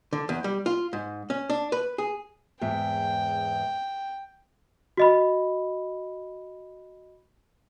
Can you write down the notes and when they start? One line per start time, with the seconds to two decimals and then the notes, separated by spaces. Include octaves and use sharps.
0.13 D3
0.29 E2
0.44 G3
0.66 F4
0.93 G#2
1.30 C#4
1.50 D4
1.72 B4
1.98 G#4
2.61 E2 G#2 E5 G5
4.97 F#4 D#5 B5